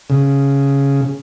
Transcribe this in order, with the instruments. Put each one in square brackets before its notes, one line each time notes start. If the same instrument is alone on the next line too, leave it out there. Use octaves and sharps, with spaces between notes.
[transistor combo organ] C#3